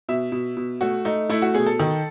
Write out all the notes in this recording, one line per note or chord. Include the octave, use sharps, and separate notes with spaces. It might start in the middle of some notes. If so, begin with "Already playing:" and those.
B2 E5
B2
B2
A3 F#4
A3 D#4
A3 E4
F#4
B2 G#4
A4
D#3